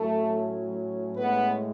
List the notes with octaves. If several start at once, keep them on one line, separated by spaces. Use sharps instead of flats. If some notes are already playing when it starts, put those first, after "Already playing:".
Already playing: A2 F#3 A3 C#4 A4
A2 G#3 B3 C#4 B4